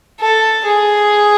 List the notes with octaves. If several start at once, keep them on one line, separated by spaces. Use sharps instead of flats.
A4
G#4